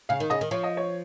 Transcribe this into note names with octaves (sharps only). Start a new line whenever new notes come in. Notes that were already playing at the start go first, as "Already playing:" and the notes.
C#3 F5
D#3
C#3 D#5
D#3
F3 C#5
D#5
C#5